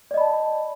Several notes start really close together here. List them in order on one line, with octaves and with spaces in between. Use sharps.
D5 D#5 B5 A5